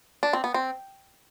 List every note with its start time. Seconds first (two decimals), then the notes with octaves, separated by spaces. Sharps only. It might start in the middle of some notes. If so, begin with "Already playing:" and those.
0.23 D4
0.33 C4
0.44 B3
0.54 C4